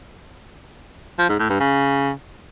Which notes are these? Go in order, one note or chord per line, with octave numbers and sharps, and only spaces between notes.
F3
G#2
A2
G2
C#3